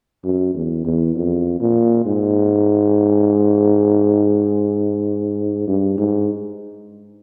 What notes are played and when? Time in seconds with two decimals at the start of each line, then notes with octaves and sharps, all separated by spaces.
0.24 F#2
0.55 E2
0.85 E2
1.16 F2
1.60 A#2
2.06 G#2
5.68 G2
5.98 G#2